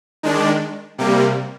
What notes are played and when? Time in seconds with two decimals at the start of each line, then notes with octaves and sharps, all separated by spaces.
0.23 D#3 G#3 D4
0.98 C3 G3 A#3